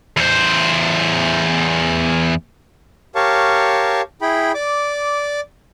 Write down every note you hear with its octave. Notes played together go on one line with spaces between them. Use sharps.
E2 C5
G4 A#4 C#5 F5 A5 C#6
E4 G#4 G5 B5
D5 D6